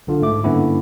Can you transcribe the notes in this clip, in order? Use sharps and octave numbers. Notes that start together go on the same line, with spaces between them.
B1 D3 F4
G#2 A3 D6
G2 D3 A#3 B3 C#4 E4